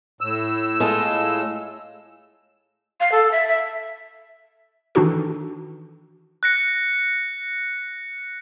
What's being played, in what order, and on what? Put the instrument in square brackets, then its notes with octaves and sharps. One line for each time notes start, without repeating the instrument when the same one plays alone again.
[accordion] A2 E6
[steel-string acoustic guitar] G#3 F4 A4
[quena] F5
A4
E5
E5
[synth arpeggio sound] D#3 E3 D4 D#4 F#4 A4
[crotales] F#6 A#6 C#7